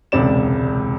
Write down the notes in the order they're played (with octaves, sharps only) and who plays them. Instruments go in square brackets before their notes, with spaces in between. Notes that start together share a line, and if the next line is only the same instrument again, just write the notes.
[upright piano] E1 C#2 C3 D5 E7